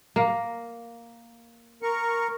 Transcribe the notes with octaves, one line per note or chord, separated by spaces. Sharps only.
A#3
A#4 C#6